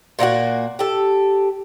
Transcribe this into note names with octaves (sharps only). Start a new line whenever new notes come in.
A#2 A#3 D#4 F#4
G4 A4